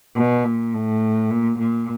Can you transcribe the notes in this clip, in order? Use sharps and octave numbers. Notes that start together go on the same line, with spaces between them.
B2
A#2
A2
A#2
A#2